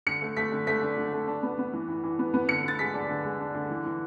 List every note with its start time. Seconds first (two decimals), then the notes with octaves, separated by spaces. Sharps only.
0.07 D3 C#7
0.22 A3
0.37 A3 B6
0.52 D3
0.67 A3 B6
0.82 D4
0.97 D3
1.13 A3
1.28 D4
1.43 B3
1.58 B3
1.73 E3
1.88 E3
2.04 E3
2.19 B3
2.34 B3
2.49 D3 C#7
2.64 D3 A6
2.79 G#3 B6
2.94 D4
3.09 D3
3.24 G#3
3.40 D4
3.55 D3
3.70 E3
3.85 E3